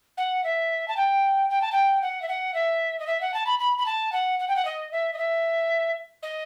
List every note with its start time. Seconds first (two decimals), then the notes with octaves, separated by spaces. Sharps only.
0.17 F#5
0.44 E5
0.88 A5
0.97 G5
1.50 G5
1.61 A5
1.72 G5
2.02 F#5
2.22 E5
2.28 F#5
2.54 E5
2.99 D#5
3.07 E5
3.21 F#5
3.34 A5
3.46 B5
3.59 B5
3.78 B5
3.86 A5
4.12 F#5
4.39 F#5
4.48 G5
4.56 F#5
4.65 D#5
4.92 E5
5.13 D#5
5.18 E5
6.22 D#5